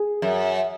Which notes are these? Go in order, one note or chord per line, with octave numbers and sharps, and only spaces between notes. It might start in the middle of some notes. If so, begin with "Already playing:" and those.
Already playing: G#4
F#2